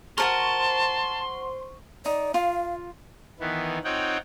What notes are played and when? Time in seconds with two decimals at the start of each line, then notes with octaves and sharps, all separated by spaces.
0.18 F#4 A4 A#4 C5 A5 C6 C#6
2.06 D#4 D5
2.34 F4 F5
3.40 D#3 E3 B3
3.84 C4 D#4 F4 C#5 F#5 G5